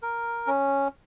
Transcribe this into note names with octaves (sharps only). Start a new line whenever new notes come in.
A#4
C#4